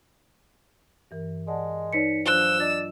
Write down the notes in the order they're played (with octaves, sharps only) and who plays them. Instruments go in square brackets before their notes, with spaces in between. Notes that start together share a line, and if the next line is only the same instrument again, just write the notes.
[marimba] G2 E3 A#4
[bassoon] G#3 [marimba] D5 F#5 A5
[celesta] D#4 B6 C#7 [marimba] B4 C#5 D5
[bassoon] F3 [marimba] F#3 D4 F4 [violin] E6 [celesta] F#6 G7
[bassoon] D4 [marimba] D#5 [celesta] A6